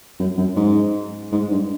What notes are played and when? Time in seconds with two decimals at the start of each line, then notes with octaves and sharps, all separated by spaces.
0.19 F#2
0.37 F#2
0.56 G#2
1.32 G#2
1.51 G2